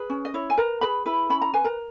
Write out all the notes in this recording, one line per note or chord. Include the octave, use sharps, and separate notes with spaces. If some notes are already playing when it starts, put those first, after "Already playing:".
Already playing: G#4 B4
C#4
D#5
E4 C#5
G#5
A#4 B4 A#5
G#4 B4 B5
E4 B4 B5
C#4 B5
A#5
B4 G#5
A#4 A#5